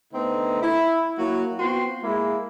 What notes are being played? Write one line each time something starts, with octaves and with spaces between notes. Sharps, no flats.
D3 A3 B3 C4 D#4
E4
F#3 A#3 E4 F#4
B3 C4 F4 F#4 G5 C6
G#3 A#3 E4